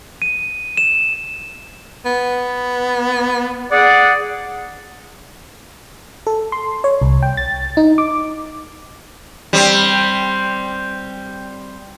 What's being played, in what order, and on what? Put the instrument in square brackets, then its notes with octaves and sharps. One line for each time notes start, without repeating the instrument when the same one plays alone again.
[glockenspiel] D#7
E7
[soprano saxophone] B3
[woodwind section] G#4 D5 F#5
[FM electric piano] A4
C6
C#5
C2
G5
A6
D#4
D6
[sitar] G3 C4